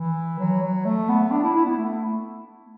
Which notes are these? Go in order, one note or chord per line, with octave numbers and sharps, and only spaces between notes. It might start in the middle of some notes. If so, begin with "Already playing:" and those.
Already playing: E3
F#3
F#3
A3
B3
D4
E4
E4
B3
A3